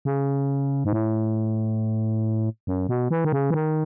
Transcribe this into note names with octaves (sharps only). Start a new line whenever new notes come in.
C#3
G#2
A2
F#2
B2
E3
D#3
C#3
E3
D#3